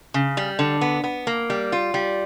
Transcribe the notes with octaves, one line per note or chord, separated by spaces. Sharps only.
C#3
G3
D3
B3
B3
A#3
G3
F4
G3